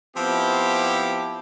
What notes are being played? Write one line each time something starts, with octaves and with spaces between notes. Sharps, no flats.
F3 B3 C4 E4 G4